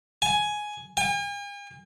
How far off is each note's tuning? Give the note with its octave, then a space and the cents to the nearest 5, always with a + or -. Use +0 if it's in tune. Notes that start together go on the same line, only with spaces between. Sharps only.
G#5 +10
G#5 -45